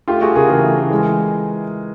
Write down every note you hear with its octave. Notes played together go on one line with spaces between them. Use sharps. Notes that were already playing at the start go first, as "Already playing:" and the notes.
A3 F4 G4
A3 F#4 G#4
C#3 G#4 A#4
E3 G#4 A#4
A3
E3
G#3